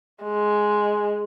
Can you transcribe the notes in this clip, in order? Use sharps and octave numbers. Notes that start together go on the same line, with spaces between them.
G#3